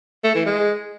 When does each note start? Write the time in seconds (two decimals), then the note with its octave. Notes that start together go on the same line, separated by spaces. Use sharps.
0.24 A3
0.35 E3
0.46 G#3